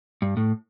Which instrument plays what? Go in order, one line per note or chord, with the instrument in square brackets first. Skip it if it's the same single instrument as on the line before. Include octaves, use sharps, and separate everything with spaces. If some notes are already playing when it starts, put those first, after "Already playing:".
[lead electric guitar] G2
A2